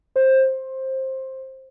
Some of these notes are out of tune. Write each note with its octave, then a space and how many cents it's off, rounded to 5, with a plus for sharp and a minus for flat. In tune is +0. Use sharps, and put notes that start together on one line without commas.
C5 +15